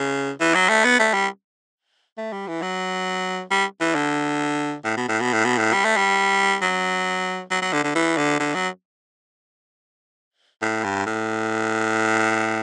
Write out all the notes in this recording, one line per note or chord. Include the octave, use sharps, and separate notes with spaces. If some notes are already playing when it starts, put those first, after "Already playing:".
Already playing: C#3
E3
F#3
A3
B3
A3
G3
A3
G3
E3
F#3
G3
E3
D3
A2
B2
A2
B2
A2
B2
A2
G3
A3
G3
F#3
F#3
F#3
D3
D3
E3
D3
D3
F#3
A2
G2
A2